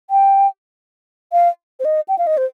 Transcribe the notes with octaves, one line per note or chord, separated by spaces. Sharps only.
G5
F5
C5
D#5
G5
F5
D#5
C5